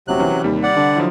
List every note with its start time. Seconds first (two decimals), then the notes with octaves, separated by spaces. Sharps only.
0.08 D#1 C3 F#3 F#6
0.19 E3 C#4
0.44 D#2 C3 G3
0.63 D5 F#5
0.76 D3
0.96 F3 F#3 E4